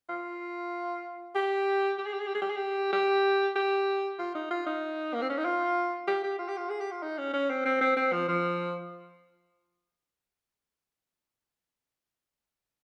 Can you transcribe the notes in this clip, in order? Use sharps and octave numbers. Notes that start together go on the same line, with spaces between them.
F4
G4
G4
G#4
G4
G#4
G4
G#4
G4
G#4
G4
G4
G4
F4
D#4
F4
D#4
A#3
C4
C#4
D#4
F4
G4
G4
F4
G4
F4
G#4
G4
F4
D#4
C#4
C#4
C4
C4
C4
C4
F3
F3